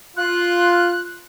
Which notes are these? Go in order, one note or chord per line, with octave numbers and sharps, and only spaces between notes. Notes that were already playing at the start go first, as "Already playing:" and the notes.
F4 F#6